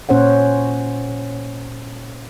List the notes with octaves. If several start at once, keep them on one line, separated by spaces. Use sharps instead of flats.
A#2 C#4 C5 C#5 F#5